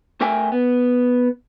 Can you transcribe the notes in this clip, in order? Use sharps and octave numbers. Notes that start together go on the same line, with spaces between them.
A3 A#4 E5 G5 G#5
B3